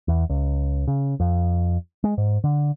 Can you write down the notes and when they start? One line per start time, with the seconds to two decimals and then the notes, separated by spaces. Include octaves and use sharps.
0.08 E2
0.29 C#2
0.88 C#3
1.20 F2
2.04 G#3
2.18 G#2
2.44 D3